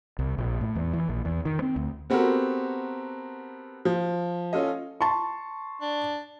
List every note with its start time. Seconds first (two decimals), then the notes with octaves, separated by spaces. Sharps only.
0.19 C2
0.38 A#1
0.61 A2
0.76 E2
0.94 E3
1.09 A#1
1.25 E2
1.45 D#3
1.62 C4
1.76 D2
2.10 B3 C4 F#4 G4 A4 A#4
3.85 F3
4.53 C#4 F4 A4 D#5
5.01 A5 C6 C#6
5.81 D4